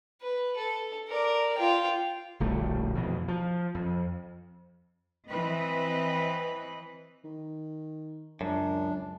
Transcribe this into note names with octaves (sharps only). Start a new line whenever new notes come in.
B4
A4
A#4 D5
F4 G5
D1 A#1 G3 A3
F2 B2 E3
F3
F2
E3 C4 B4 D#5
D#3
C#2 F#2 D4